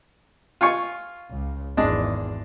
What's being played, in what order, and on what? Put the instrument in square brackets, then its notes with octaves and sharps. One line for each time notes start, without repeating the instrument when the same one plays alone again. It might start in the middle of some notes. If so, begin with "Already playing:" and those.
[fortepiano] F4 G#5 C#6
[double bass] C#2
[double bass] G#1 E2 [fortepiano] G#3 D4